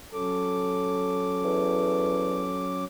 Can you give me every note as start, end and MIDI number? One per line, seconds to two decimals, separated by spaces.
0.14 2.85 54
0.14 2.85 61
0.14 2.79 69
0.14 2.85 86
1.44 2.48 40